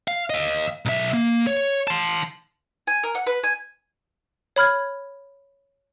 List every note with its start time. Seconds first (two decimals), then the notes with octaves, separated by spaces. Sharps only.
0.08 F5
0.30 D#5 F5
0.86 B1 E5
1.14 A#3
1.47 C#5
1.87 A5 C6
2.87 G#5
3.03 A#4
3.15 F#5
3.27 B4
3.43 G#5
4.56 C#5 B5 F6 G#6